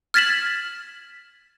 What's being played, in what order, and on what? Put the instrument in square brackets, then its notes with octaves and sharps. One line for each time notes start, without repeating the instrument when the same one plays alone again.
[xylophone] F6 G#6 A6 B6 E7 F#7